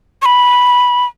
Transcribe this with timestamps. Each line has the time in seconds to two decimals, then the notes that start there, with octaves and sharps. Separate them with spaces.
0.22 C#6
0.26 B5